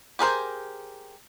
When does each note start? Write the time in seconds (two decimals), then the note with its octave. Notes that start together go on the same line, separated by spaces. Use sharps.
0.19 G4 G#4 A#4 C5